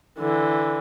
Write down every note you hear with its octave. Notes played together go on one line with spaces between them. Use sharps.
D3 E3